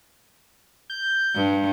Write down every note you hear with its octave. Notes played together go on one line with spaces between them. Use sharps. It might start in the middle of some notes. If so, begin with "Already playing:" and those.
G6
G2